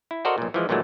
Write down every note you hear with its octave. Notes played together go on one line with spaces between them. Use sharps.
E4
F#4 A4 A#4 C5 D5 D#5
B1 A#2
E3 F3 G#3
A#2 D3 E3 F#3 G#3 A3